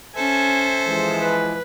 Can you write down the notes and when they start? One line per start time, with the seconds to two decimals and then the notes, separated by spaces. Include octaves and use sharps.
0.16 C#4 A4 C5 E5 G#5
0.88 E3 F3 G#3
1.22 B4